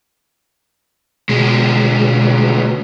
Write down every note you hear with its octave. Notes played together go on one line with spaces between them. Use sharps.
D2 B2 G#3